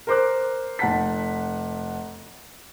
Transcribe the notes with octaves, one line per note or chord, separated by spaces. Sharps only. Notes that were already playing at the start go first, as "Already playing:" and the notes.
A#4 C5 D6 F#6
F1 F#5 A5 B6